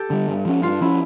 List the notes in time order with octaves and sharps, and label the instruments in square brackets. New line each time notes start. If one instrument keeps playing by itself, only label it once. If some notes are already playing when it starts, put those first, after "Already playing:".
Already playing: [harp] G4 A4
[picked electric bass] D3 G3
G2
F3 C#4
[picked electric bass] G2 [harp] F4
[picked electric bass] F3 C#4 [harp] E4